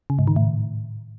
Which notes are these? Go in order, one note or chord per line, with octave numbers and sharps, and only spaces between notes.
C#3
G#2
D#3
A2